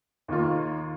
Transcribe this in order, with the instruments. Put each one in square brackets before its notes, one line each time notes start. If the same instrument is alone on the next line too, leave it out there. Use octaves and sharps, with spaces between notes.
[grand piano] D#2 D#3 A#3 F4